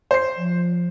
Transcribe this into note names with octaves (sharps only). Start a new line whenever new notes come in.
C5 C7
F3